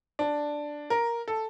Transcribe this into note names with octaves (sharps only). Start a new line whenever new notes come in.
D4
A#4
A4